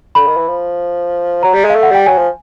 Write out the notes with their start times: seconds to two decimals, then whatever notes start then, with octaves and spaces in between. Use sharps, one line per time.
0.15 D3 B5
0.26 D#3
0.37 E3
0.47 F3
1.43 F#3 A#5
1.53 G3
1.64 G#3
1.70 F5
1.75 A3
1.83 F#5
1.91 G3 G5
2.06 F#3 G#5
2.17 F3